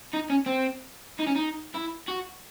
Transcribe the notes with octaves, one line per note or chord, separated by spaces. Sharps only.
D#4
C#4
C4
D#4
C#4
D#4
E4
F#4